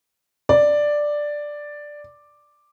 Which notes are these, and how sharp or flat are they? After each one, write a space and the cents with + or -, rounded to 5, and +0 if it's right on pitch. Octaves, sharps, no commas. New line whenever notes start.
D5 +5